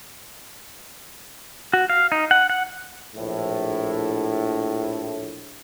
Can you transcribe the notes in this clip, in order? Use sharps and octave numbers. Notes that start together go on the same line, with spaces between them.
F#4
F5
D#4
F#5
F#5
A#1 A2